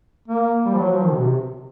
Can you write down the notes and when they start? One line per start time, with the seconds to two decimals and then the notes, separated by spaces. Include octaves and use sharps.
0.28 A#3
0.65 G3
0.73 F3
0.78 F#3
0.92 F3
1.03 D#3
1.13 B2
1.23 C3